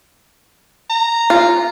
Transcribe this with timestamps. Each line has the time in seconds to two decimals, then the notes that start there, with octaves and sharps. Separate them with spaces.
0.90 A#5
1.30 F4